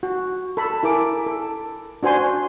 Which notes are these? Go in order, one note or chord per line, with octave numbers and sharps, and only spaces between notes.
F#4
A4 B5
E4 G#4 A#4 D6
A4
D4 F#4 C5 G#5 C6